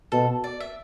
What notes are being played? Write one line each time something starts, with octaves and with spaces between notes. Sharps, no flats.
B2 A4
D5
E5